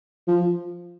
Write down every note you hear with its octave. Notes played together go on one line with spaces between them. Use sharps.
F3